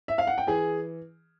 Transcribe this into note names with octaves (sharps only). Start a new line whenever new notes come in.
E5
F5
F#5
G5
E3 G#4 G#5